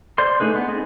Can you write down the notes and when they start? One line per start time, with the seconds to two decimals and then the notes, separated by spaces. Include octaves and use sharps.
0.18 C5 D5 C6
0.40 A3 D#4 G#4 B4
0.55 B3
0.68 C4 D#4 G#4